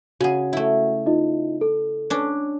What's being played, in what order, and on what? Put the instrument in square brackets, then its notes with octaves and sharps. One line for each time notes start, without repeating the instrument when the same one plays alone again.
[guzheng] C#3 G#4 [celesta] F#4 F#5
[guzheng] A3 E4
[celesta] D#4 F4 D#5
A4
[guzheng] C#4 D4